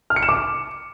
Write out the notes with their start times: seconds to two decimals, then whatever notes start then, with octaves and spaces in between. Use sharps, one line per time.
0.10 F6
0.16 C#7
0.22 E7
0.29 D6